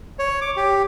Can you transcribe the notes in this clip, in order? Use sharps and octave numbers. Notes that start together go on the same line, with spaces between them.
C#5
D6
G4